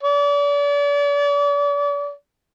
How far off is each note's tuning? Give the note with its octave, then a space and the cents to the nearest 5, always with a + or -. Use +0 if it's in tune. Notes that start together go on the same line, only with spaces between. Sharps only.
D5 -40